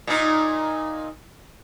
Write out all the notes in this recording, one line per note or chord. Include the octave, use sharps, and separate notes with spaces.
A#2 D#4